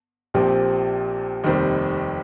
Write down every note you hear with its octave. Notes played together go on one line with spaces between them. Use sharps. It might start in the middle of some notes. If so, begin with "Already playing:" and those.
A#1 A#2 F3 C4 G4
F1 D#2 D#3 G3 C4